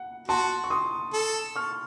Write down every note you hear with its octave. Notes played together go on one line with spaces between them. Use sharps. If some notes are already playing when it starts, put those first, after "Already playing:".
Already playing: F#5
F#4 A5 C6
C#6
C6 D#6
A4
C#6 F6